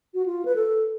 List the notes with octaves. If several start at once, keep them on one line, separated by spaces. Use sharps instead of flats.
F#4
F4
B4
A4